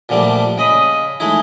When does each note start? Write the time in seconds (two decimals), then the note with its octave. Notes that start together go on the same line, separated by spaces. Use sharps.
0.09 A#2 D3 F3 G3 A3
0.58 C#3 D#5 B5 D#6
1.20 G#3 A3 D#4 E4